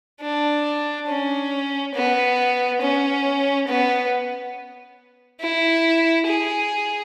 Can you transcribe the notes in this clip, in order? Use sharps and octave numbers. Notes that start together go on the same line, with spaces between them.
D4
C#4
B3
C#4
B3
E4
G#4